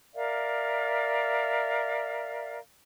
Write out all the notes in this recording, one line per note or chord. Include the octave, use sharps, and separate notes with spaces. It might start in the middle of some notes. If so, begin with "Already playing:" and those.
A#4 D5 E5 F5